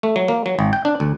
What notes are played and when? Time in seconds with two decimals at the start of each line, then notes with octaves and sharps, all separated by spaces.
0.03 A3
0.16 F#3
0.28 A#3
0.46 F#3
0.59 G#1
0.73 G5
0.85 D4
1.00 D2